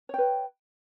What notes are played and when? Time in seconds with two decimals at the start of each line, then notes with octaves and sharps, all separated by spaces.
0.09 C#5
0.14 G5
0.18 B4